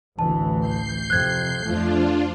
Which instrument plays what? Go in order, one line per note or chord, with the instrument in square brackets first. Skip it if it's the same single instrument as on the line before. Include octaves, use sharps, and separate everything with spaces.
[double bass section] A1 D2 E3 [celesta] A5
[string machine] G6 C7
[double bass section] F2 C3 [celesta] F#6 G#6
[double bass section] F2 F3 A3 [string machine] D4 F4